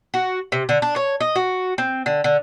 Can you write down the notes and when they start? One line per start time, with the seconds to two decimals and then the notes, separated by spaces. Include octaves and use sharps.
0.14 F#4
0.52 C3
0.69 D3
0.82 D4
0.96 C#5
1.20 D#5
1.35 F#4
1.78 C4
2.06 D3
2.24 D3